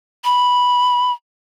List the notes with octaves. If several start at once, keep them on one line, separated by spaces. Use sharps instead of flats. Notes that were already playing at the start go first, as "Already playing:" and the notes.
B5